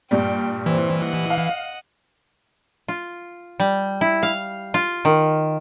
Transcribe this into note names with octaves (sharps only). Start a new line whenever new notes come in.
G2 A#2 G3 G5
E3 C4 C5
D#5 F#5
F5
F4
G3
E4
F5
F4
D#3